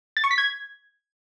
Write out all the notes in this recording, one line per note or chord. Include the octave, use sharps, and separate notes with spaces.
A6
C#6
B6
G#6